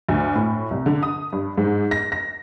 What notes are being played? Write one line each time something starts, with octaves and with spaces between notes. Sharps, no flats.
D2
A2
C2
D3
D#6
G2
G#2
A#6
A#6